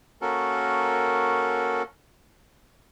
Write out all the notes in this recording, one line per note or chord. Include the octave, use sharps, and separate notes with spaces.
A#3 C#4 F#4 A4 A#4